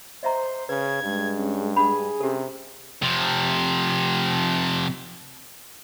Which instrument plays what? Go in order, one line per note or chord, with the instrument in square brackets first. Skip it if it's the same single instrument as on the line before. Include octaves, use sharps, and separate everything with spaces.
[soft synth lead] C5 [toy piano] D#5 E5 A#5
[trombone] C#3 [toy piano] B4 [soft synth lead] G#6
[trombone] G2 [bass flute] G#3
[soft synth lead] C#4
[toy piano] D4 F#5 B5 [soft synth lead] G#4
[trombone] C3 [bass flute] C#4 [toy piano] G4 A4
[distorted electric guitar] C3 F3